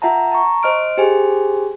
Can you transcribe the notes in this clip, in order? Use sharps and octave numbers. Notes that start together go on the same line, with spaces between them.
F4 E5 F#5 A5 A#5
A5 A#5 C#6
C5 D#5 F6 D7
G4 G#4 C5 G#5